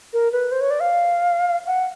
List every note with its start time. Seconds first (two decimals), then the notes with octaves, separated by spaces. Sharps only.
0.13 A#4
0.32 B4
0.52 C5
0.61 C#5
0.71 D5
0.80 F5
1.67 F#5